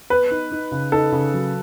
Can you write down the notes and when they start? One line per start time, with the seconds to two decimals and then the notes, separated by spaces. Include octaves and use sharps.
0.10 B3 B4
0.31 D#4
0.52 D#4
0.72 C#3
0.92 D#4 A4
1.12 C#3
1.34 F#3